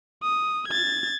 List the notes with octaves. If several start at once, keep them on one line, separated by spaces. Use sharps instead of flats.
D#6
G#6 A6